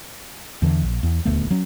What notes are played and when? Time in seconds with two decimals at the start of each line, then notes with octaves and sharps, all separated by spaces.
0.62 E2 D3 E3
0.83 A#1
1.03 E2
1.25 D#1 D2 A3 B3
1.51 F#3 C#4